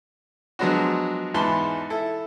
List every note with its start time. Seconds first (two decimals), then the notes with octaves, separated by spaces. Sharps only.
0.59 F3 F#3 G#3 B3 D4 F#4
1.34 E2 G#2 B3 A5 B5 C6
1.90 E4 A4